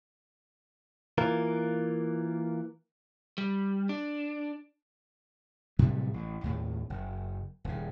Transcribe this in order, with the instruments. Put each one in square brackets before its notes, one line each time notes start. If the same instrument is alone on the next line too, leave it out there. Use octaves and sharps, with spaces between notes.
[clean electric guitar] E3 A#3 F4 A#4
[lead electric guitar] G3
D4
[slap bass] A2 C3 F#3 G3
A1
D#2 A2
F#1
D#1 C#3